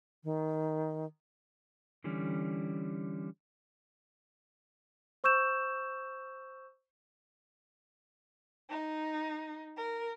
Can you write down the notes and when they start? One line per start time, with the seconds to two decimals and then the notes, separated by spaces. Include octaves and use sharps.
0.24 D#3
2.04 D3 E3 G3 C#4
5.24 C5 C#6 E6 G6 E7
8.70 D#4
9.77 A#4